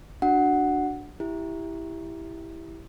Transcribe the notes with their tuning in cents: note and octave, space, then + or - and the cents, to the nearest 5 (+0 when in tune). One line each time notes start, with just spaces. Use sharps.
D4 +0 F#4 +0 F#5 +0
E4 +0 G4 +0